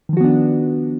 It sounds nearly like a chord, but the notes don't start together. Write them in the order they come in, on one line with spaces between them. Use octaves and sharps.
D#3 F3 F#4 B3 D4